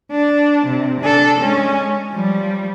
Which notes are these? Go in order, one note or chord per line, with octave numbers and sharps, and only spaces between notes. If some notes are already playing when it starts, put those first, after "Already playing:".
D4
C3
D4 A4
G#3 C#4
F3 G3